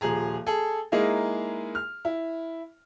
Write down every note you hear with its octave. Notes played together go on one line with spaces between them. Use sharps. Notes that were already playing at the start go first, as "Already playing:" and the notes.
D#1 F3 G#4 A#5
G#4 A4
G#3 A#3 D#4 E4 G#4
F6
E4